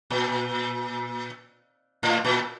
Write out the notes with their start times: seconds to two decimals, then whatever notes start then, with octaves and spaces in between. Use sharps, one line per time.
0.10 A#2
2.03 A2
2.25 A#2